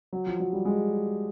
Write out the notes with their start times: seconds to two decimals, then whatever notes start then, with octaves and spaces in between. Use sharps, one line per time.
0.13 F#3
0.26 F3
0.40 F#3
0.53 G3
0.65 G#3